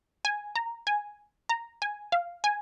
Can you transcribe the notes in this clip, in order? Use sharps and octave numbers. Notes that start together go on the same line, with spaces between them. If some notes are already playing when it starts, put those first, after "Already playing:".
G#5
A#5
G#5
A#5
G#5
F5
G#5